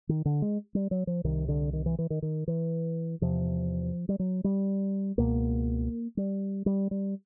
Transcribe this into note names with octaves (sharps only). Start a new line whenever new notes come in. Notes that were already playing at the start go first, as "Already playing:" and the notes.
D#3
D3
G#3
G3
F#3
F3
C2 C3 D#3
D3
D#3
E3
E3
D#3
D#3
E3
E2 C3 F3
G3
F#3
G3
C#2 B2 A#3
G3
G3
G3